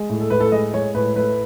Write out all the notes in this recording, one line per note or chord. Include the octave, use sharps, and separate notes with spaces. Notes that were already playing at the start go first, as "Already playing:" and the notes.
Already playing: G#3
A2
A4
A2 B4
A4
G#3 D#5
G#3 C#5
A2 B4
A3 B4